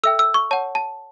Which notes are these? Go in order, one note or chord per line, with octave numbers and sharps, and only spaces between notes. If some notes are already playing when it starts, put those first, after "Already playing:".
A4 E5 G5 E6
E6
C#6
C#5 F#5 A5
A5